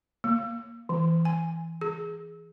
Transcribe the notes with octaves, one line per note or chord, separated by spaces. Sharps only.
A#3
E3
G#5
G#4